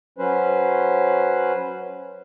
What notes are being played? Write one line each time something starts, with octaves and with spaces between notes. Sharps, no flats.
F#3 C#4 B4 C5